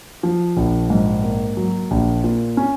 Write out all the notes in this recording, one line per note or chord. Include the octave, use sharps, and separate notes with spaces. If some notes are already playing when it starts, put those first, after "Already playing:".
F3
A#1
G#2
A#3
F#3
A#1
A#2
C#4